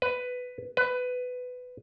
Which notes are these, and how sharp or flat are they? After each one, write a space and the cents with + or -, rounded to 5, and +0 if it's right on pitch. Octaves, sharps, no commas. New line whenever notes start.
B4 +10
B4 +15